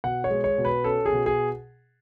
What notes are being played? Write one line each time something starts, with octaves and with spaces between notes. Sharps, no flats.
B2 F#5
C#5
G#3
C#5
B2
B4
C#4 A4
G#4
B2
G#4